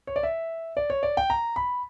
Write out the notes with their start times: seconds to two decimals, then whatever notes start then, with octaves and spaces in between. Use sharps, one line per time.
0.07 C#5
0.16 D5
0.23 E5
0.77 D5
0.90 C#5
1.03 D5
1.17 G5
1.30 A#5
1.56 B5